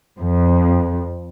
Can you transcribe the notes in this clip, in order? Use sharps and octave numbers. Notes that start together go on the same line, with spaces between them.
F2